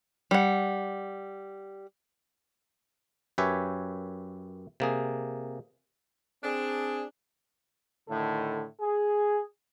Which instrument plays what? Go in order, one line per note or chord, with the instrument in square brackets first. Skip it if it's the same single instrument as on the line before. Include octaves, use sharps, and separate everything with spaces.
[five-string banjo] G3 F#5
[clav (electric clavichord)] F#2 G4 B4 C#5 E5 G#5
C3 A#3 G#4
[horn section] C4 D4 G#4
[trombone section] A2 D3 D#3 A4
G#4